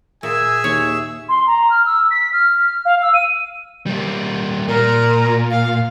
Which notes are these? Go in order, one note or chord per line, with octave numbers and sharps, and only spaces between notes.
A#2 G#4 E5 G#5 E6
D#2 C#5
C6
A#5
F6
E6
B6
F6
F5
E6
D#7
G3 A#3
A#2 A#4
F5